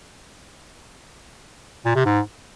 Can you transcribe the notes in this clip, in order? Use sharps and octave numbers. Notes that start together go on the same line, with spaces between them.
A#2
C3
G#2